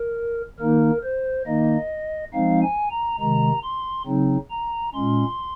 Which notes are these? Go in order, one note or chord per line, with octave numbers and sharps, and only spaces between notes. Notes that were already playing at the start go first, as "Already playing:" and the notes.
Already playing: A#4
D#3 A#3 D#4 A#4
C5
D#3 A#3 D#4 D#5
F3 G#3 C4 D#4 F5
G#5
A#5
C3 D#3 G#3 A#5
C6
C#3 F#3 C4 D#4
A#5
A#2 G#3 C#4 C6